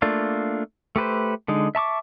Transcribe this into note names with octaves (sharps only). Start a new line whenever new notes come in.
A3 A#3 D4 F4
A3 G4 B4 C5
D3 G#3 D#4
E5 A5 C#6 D6